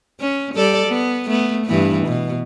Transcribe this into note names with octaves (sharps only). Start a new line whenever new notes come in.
C#4
G3 A4 D5
B3
A3 B3
G2 E3 B3
B2